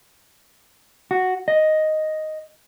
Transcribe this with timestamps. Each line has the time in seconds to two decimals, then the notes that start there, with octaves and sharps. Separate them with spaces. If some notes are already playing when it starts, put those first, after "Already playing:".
1.11 F#4
1.48 D#5